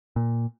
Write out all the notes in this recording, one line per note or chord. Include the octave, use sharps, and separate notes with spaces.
A#2